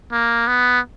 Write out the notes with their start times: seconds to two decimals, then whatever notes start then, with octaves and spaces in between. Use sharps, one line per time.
0.12 A#3
0.48 B3